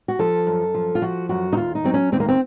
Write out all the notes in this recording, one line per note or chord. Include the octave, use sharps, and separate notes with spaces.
F#4
F3 A4
F#2
F3
F4
F3 F#4
F#2 F#4
D#4
D#2 F4
D#4
F#3 C4
C#4
D#2 C4
A#3
C4